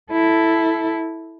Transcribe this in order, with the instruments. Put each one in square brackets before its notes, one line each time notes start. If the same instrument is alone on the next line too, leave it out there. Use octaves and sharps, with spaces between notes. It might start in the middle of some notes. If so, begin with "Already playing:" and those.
[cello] E4 A4